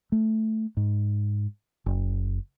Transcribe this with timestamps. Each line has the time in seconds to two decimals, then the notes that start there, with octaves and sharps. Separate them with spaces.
0.12 A3
0.77 G#2
1.86 F#1